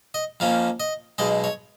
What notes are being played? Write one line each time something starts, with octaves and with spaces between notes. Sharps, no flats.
D#5
F2 F3 A#3 C#4 F5
D#5
B1 B2 G#3 D#5
C#5